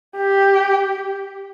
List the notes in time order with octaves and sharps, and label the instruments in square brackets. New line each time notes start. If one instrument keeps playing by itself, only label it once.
[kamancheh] G4